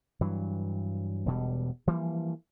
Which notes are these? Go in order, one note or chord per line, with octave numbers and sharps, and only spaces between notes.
G2 E3 F#3
E1 B2 G3
E3 F3 G3 A#3